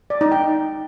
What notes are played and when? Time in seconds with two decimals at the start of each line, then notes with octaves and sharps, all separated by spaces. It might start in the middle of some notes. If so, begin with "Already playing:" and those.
0.10 D5
0.21 D#4
0.32 G5